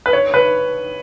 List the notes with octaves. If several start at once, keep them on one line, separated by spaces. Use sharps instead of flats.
B4
C#5
B4